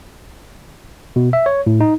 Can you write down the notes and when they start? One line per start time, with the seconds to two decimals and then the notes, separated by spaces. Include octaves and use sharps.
1.16 B2
1.33 E5
1.46 C#5
1.66 A2
1.81 D#4